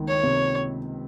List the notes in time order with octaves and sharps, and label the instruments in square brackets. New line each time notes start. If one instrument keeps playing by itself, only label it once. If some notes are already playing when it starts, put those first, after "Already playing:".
Already playing: [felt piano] C#2 D#3
[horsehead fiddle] C#5
[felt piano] C3